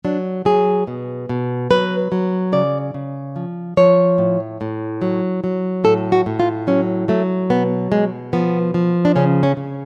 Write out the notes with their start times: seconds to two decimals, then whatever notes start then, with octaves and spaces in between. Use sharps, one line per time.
0.05 F#3 D4
0.45 F#3 G#4
0.87 B2
1.29 B2
1.70 F#3 B4
2.12 F#3
2.52 C#3 D5
2.94 C#3
3.36 F3
3.77 F3 C#5
4.18 A2
4.61 A2
5.02 F#3
5.44 F#3
5.84 A2 A4
6.12 F#4
6.26 A2
6.40 F4
6.67 F#3 C#4
7.08 F#3 A3
7.50 B2 B3
7.91 B2 G#3
8.33 F3 B3
8.74 F3
9.05 D4
9.16 C#3 C#4
9.43 C#4
9.57 C#3